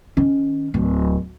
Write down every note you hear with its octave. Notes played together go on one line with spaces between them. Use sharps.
D#3 C#4
D1